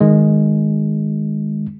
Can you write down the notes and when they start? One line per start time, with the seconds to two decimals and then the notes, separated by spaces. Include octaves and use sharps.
0.01 D#3 G#3